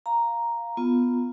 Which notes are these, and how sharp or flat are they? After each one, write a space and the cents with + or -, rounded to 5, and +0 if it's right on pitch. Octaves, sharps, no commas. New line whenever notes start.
F5 +0 A#5 +0
B3 +0 F4 +0